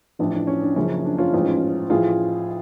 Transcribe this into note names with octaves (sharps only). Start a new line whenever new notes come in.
A1 A2 F3 D4
D4
C#4
D4
F#1 F#2 C#3 F3 C#4
D4
C#4 F4
A1 G#2 F3
A1 A2 F3 F4 G#4